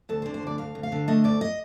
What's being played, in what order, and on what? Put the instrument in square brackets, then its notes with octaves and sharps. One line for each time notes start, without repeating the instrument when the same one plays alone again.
[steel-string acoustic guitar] D2 A4
C5
D3
C5
D2 D5
D2 F5
D2
F5
D3
A3 D#5
D2 D5
D#5